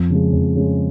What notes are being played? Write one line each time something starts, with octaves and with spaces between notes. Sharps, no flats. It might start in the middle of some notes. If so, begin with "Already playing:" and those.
Already playing: F2
C#3 G#3
F2
C#3 G#3